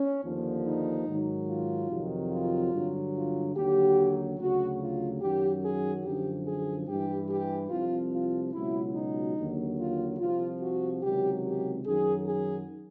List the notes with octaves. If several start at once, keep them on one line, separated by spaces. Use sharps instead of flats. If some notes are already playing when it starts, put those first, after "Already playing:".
Already playing: C#4
D#2 D3 F3
D#4
G#2 D#3 F#3
F4
F2 C3 D#3 F#3
F4
G2 D3 F#3
F4
D#2 D3 F#3 G4
D2 C#3 F#3 F#4
F4
F#2 D#3 F#3 G4
G#4
F#2 D3 F3 G4
G#4
G2 E3 G4
G4
C2 C3 F3 F4
F4
C#2 B2 F#3 E4
D#4
D#2 D3 F#3
F4
C2 C3 F3 F4
F#4
C#2 C3 D#3 F#3 G4
G4
F#2 D#3 F#3 G#4
G#4